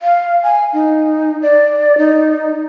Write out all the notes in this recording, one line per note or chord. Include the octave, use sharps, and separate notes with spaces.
F5
G#5
D#4
D5
D#4